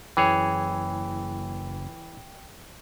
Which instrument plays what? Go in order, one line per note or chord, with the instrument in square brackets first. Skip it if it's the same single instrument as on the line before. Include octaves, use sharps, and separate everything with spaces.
[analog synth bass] F#1 [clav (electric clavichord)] E3 G#4 C#5 [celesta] G5